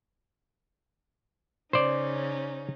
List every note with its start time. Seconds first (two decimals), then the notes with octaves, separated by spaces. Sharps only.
1.73 C#3 C#4 D#4 C5 D5